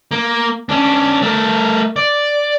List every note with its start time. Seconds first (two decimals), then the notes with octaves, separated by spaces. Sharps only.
0.11 A#3
0.69 C#4 D4
1.22 A3 A#4
1.96 D5